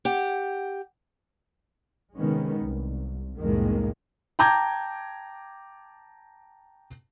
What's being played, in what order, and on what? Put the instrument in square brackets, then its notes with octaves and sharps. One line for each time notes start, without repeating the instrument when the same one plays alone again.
[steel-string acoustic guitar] G4 F#5
[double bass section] C3 D#3 G#3 B3 C#4
C2
C2 F2 A2 D#3 G#3 A#3
[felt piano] G5 A5 A#5 D6 G6 G#6